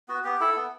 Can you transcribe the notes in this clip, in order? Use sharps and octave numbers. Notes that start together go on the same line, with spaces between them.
B3 F#4
B3 G4
E4 A4
B3